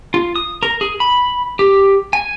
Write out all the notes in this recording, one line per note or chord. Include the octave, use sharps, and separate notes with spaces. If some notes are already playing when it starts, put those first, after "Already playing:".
F4
D#6
A#4
G#4
B5
G4
G#5